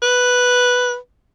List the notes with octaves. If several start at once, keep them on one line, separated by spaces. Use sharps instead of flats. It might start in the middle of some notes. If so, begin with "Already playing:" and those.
B4